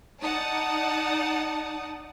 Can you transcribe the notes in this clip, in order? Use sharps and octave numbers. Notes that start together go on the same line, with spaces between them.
D#4 D5 F#5 A5 D#6